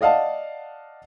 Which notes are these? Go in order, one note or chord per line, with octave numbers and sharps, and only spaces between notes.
D5 D#5 F5 F#5 A5